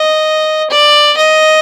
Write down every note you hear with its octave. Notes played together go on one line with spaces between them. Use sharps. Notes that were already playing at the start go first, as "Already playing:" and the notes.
Already playing: D#5
D5
D#5